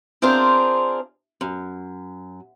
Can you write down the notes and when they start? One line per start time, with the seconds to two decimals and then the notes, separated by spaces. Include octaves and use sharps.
0.22 C4 D4 F4 G#4 A#4 C5
1.41 F#2